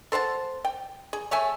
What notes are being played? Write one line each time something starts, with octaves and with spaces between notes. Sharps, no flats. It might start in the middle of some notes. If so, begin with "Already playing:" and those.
A4 C5 F#5 A5
G5
G#4
A3 C#5 E5 G#5